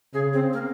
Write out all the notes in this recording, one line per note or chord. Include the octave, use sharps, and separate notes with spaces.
C#3 G#4
C4
A#3